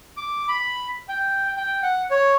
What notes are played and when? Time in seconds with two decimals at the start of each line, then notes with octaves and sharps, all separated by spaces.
0.17 D6
0.48 B5
1.09 G5
1.57 G5
1.83 F#5
2.11 C#5